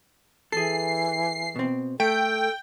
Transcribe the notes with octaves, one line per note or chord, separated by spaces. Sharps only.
E3 G#4 A4 C7
B2 C4
A3 A4 G5